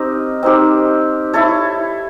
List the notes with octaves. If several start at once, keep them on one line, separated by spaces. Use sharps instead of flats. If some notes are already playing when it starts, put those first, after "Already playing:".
Already playing: C4 D#4 G4 A#4
C4 D#4 G4 A#4
E4 A4 C#5